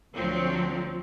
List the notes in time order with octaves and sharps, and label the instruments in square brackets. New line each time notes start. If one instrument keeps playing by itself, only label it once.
[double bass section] D2 [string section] F3 F#3 C4